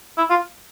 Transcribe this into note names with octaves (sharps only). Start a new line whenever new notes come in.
E4
F4